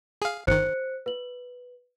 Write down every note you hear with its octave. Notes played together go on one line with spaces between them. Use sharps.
G#4 F5
G1 D#3 C5 F#6 C#7
B4 F#7